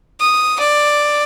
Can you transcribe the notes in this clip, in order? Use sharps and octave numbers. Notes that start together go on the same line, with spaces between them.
D#6
D5